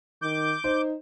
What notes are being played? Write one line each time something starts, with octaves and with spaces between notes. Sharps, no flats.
D#3 D6 G6
D#4 C5